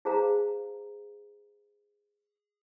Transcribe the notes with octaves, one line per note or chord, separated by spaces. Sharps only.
E4 G#4 C5 F5 A#5